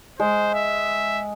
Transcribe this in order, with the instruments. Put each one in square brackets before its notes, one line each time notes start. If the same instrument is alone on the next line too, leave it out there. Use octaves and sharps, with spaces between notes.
[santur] G#3 [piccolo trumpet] C5
[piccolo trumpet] E5